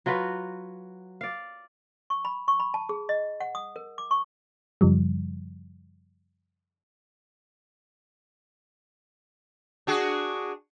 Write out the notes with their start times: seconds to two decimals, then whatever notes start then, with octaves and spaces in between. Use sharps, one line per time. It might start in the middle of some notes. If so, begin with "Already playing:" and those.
0.06 F#3 F4 F#4 B4
1.21 D5 F5
2.10 C#6
2.25 B5
2.48 C#6
2.60 B5
2.74 A5
2.89 G#4
3.09 D#5
3.40 F#5
3.55 D#6
3.76 A#4
3.98 D6
4.11 C#6
4.81 F#2 C#3 F3 G3
9.87 D4 F#4 G#4